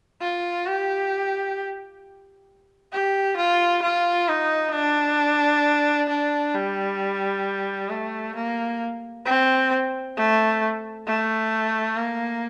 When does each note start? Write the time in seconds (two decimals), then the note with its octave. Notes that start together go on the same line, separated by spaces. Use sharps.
0.21 F4
0.67 G4
2.92 G4
3.37 F4
3.83 F4
4.29 D#4
4.73 D4
6.09 D4
6.55 G3
7.90 A3
8.36 A#3
9.26 C4
10.17 A3
11.07 A3
11.96 A#3